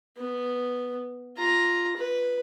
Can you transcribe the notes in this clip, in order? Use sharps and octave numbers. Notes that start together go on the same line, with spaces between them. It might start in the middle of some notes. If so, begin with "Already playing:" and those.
B3
F4 A#5
B4